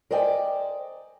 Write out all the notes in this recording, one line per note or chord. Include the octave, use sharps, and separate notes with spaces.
A#4 C5 D5 D#5 G5 G#5